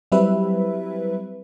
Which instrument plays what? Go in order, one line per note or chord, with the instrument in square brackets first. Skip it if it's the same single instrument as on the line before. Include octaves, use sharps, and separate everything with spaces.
[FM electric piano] F#3 G3 C4 E4 B4 E5